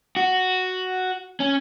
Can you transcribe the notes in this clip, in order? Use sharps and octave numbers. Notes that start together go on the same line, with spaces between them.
F#4
C#4